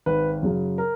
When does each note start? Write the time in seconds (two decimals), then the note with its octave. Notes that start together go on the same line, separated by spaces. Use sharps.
0.06 G#1 B4
0.43 F#2 C#3 F#3
0.78 A#4